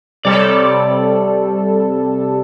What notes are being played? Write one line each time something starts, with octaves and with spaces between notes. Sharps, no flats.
C3 G3 A4 C#5 D5